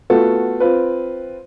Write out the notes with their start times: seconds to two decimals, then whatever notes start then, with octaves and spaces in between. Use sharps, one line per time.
0.10 A3 B3 F4 F#4 A4
0.60 C4 F4 B4